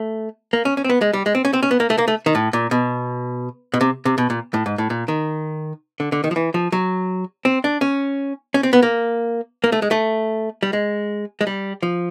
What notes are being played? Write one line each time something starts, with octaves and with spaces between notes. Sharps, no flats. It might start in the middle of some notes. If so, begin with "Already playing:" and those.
Already playing: A3
A#3
C#4
C#4
C4
B3
G#3
G3
G#3
C4
C#4
C4
C#4
B3
A#3
A3
A#3
A3
D#3
A2
A#2
B2
B2
C3
C3
B2
A#2
A2
G#2
A2
A#2
D#3
D3
D3
D#3
F3
E3
F3
F#3
C4
D4
C#4
C#4
C4
B3
A#3
A#3
A3
G#3
A3
G3
G#3
G#3
G3
F3